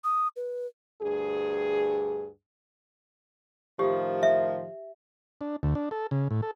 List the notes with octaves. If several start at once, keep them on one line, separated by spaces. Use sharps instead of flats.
D#6
B4
D2 G2 G#4
A2 D#3 F3 G4
E5
D4
D2
D4
A4
C#3
A2
A4